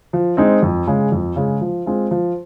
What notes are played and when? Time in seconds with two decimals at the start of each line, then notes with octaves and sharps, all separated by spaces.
0.13 F3
0.37 G#3 C4 D#4
0.62 F2
0.87 C#3 G#3
1.12 F2
1.36 C#3 G#3
1.61 F3
1.86 G#3 C4 F4
2.11 F3